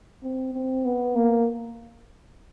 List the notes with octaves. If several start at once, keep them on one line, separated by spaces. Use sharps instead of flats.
C4
C4
B3
A#3